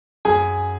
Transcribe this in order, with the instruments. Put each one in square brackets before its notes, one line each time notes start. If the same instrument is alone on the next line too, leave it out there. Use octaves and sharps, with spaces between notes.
[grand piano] F#2 G#4 G#5